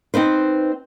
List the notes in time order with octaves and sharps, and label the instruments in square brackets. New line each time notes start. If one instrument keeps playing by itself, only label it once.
[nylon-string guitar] C4 D#4 B4 C5